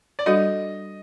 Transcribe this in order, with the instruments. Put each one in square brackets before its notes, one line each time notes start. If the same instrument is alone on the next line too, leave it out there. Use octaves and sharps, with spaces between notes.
[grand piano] D5
[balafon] G3 D4 F#4 A4 [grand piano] D#5